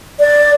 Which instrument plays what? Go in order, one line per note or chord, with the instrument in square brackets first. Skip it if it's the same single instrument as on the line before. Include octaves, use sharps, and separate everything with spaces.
[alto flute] D5